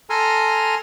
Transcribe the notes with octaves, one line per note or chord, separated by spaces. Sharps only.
A4 G#5 A#5 C6 F6